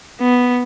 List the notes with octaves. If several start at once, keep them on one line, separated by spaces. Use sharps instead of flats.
B3